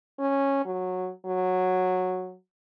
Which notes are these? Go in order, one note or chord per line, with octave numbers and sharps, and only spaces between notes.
C#4
F#3
F#3